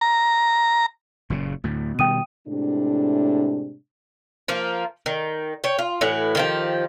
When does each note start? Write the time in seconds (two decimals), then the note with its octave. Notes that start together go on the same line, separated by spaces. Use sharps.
0.01 A#5
1.30 F#1 A#2 C#3
1.64 D2 A2
1.99 B2 D#3 G3 G5 D#6 D#7
2.48 A2 C3 G#3 D4
4.48 F3 A#3 F4
5.06 D#3
5.64 C#5 G5
5.79 F4
6.01 A2 E3 F#4
6.35 D#3 F3 G4